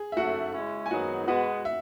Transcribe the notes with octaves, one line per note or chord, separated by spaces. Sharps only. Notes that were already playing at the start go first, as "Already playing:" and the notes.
Already playing: G#4
E5
C#3 F#3 A3 F#4 F#5
C#3 G#3 C#4 E4
G#5
G#2 D#3 F#3 B3 D#4 F#4 F#5
B2 G#3 B3 F#4 F#5
E5